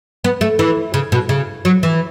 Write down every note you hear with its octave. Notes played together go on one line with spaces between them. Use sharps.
B3
A3
E3
C#3
B2
C#3
F#3
E3